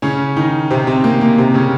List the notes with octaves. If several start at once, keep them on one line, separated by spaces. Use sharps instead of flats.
C#3 C#4
D#3 D#4
C3 C4
C3 C4
A#3
A#3
C3 C4
C#3 C#4